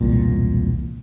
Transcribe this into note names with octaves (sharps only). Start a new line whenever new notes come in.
E1 C2 A#2